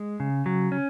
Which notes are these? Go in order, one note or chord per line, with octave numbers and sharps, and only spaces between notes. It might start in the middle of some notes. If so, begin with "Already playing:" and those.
Already playing: G#3
C#3
F#3
C#4